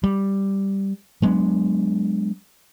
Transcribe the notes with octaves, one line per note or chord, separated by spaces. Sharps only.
G3
F#3 G#3 B3 D4